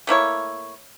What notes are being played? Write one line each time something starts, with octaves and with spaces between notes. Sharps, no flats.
A3 A#3 E4 C#5